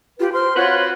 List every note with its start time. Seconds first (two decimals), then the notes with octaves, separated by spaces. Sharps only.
0.20 F4 G4 B4
0.33 C5 C6 F6
0.56 C4 F4 F#4 B4 C#5 C6